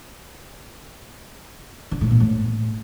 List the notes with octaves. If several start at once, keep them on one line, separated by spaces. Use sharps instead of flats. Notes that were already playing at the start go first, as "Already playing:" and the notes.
D3
A2
A#2
A2